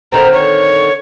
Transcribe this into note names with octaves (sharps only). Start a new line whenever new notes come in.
D3 D#3 C4 A#5
C#5